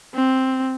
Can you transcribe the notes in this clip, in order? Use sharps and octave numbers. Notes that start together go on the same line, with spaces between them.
C4